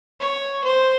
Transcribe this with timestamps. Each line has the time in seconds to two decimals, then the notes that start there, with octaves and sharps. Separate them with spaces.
0.20 C#5
0.64 C5